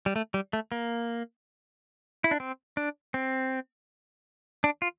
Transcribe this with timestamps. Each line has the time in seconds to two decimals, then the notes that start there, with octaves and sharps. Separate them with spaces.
0.06 G3
0.16 A3
0.34 G3
0.53 A3
0.72 A#3
2.24 E4
2.31 D4
2.40 C4
2.77 D4
3.14 C4
4.64 D4
4.82 F4